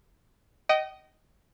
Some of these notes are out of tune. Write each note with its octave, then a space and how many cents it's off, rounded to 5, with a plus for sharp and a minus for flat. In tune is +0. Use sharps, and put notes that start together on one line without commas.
D#5 +0 G5 -40